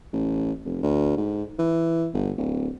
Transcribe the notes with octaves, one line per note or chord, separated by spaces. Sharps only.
A1
F1
D2
G#2
E3
G1
D1